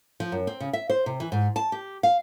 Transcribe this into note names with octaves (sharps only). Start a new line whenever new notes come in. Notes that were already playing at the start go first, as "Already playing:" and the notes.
F3
F#2
C4
C#3
E5
C5
C3
E3
G#2
A5
G4
F5